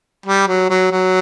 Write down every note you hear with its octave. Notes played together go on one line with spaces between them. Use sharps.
G3
F#3
F#3
F#3